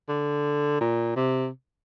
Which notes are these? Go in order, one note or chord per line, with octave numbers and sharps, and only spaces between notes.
D3
A#2
C3